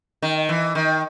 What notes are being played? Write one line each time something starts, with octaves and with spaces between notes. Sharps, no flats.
D#3
E3
D#3